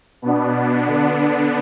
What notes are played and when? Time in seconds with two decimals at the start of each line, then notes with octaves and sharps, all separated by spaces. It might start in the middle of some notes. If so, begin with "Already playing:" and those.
0.22 B2 B3 D4
0.87 D3 B3 D4